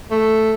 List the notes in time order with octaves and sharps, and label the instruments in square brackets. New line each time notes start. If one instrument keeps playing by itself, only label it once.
[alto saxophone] A3